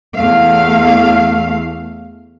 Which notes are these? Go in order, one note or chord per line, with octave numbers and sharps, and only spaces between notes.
E2 A3 F5